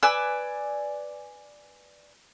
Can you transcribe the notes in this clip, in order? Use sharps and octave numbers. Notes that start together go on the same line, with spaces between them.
B4 D5 G#5 E6